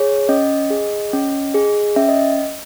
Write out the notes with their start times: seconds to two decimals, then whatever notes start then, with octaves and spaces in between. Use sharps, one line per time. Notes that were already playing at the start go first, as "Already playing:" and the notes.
Already playing: G#4 C#5
0.29 C#4 D#5
0.70 G#4
1.13 C#4
1.54 G#4
1.96 C#4 E5
2.09 D#5